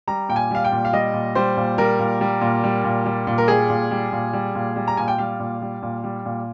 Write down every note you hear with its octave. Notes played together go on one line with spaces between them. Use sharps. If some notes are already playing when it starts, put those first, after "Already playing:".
G3 A#5
A#2 G5
G#5
G3 F5
G5
A#2
F5
G3 D#5
A#2
G3 C5
A#2
G3 A#4
A#2
G3
A#2
G3
A#2
G3
A#2
A#4
G3 G#4
A#2
G3
A#2
G3
A#2
G3
A#5
A#2 G#5
G5
G3 F5
A#2
G3
A#2
G3
A#2